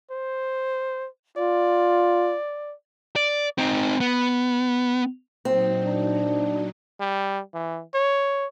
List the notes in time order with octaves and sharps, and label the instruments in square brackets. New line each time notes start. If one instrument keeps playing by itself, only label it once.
[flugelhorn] C5
[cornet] F4 [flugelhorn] D5
[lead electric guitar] D5
C4 D#4
B3
[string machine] A#2 F#3 D#4 [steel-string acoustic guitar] C4
[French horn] D4
[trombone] G3
E3
C#5